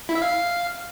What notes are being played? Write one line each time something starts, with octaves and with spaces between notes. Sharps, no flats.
E4
E5
F5